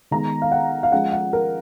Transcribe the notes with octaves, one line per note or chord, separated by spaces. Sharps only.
D#3 G#3 B3 A#5
F5
F#5
F5
F3 G#3 C#4 F#5
F#5
A#4